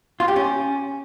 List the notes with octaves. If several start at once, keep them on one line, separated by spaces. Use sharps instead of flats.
F4
G4
C#4